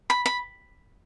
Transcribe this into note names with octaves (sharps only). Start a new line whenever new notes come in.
B5
B5